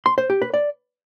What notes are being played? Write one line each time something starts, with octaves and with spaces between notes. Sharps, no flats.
C6
C5
G4
B4
D5